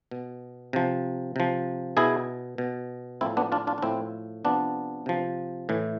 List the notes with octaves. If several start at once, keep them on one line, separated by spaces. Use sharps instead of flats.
B2
C3 F3
C3 F3
B2 E4 G#4
B2
A2 F3 C4 E4
B3 D4
D4 F4
D4 F4
D4
A2 F3 C4 E4
C3 F3 B3 D4
C3 F3
A2 E3